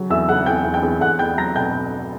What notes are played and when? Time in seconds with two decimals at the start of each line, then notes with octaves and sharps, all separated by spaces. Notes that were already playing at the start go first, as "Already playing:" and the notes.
Already playing: C#3 F#3
0.10 E2 E5 E6
0.29 C#3 F#5 F#6
0.46 E2 G5 G6
0.65 E2
0.74 G5 G6
0.83 E2
1.01 E2 F#5 F#6
1.19 E2 G5 G6
1.37 F#3 A#5 A#6
1.55 B2 G5 G6